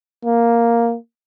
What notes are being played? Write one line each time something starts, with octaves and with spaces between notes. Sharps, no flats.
A#3